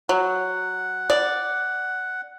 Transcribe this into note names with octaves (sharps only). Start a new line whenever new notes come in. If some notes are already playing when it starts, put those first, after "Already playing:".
F#3 F#5
D5